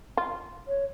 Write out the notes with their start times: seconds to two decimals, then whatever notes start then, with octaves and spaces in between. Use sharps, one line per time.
0.17 F4
0.68 C#5